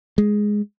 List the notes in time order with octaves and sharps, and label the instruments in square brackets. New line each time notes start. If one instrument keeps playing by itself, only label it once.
[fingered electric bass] G#3